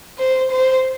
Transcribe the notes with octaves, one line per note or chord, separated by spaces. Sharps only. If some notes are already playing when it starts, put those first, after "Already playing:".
C5
C5